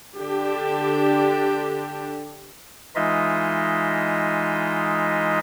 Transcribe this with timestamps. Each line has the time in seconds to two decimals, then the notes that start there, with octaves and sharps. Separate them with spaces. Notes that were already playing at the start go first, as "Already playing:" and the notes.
0.19 D3 D4 G4
2.95 E3 G#3 D#4 F4 D#5 E5